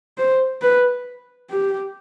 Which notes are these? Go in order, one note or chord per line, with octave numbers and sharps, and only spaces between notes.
C5
B4
G4